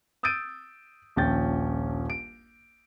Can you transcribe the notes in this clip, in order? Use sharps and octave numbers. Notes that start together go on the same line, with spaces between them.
D#6 E6 G6 A6 D7 D#7
D#1 A#1 C#4 G5 G6 A6
D7